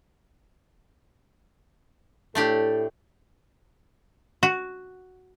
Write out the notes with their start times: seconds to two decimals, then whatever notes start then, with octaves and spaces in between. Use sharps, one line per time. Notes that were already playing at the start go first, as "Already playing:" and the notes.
2.35 A2 A3 D4 G4 A4
4.43 F#4